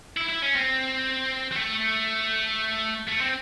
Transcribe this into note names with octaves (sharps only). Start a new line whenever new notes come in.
E4
E4
C#4
C4
C4
A3
A3
C4